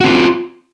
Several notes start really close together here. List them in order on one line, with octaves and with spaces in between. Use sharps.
F#4 C4 F4